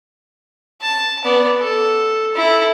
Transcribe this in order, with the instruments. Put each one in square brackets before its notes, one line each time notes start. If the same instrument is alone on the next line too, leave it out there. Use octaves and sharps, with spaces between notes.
[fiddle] A5
B3 D5
A4
E4 A4